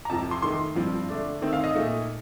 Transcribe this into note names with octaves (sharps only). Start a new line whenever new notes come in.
A#5
F2 C3 F3 A5
C6
D#3 A3 D#4 C6
G2 F3 C4
D3 A3 D4
D#3 A3 C4 D#4
F5
D#5
A#2 A3 D#4